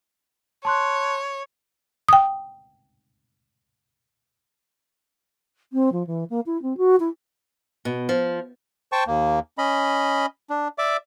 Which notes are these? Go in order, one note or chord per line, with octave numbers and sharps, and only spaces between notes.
C#5 A5 C6 F#6
G5 D#6
C4
F3
E3
A#3
E4
C4
F#4
E4
B2
F3
C5 G5 A5 C#6
D#2 A#3
C#4 D#5 B5
D4
D5 E5 D6